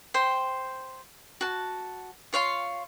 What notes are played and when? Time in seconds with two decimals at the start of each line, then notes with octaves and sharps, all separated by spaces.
0.14 C5 G5
1.41 F#4 A5
2.33 F4 C#5 F5 C6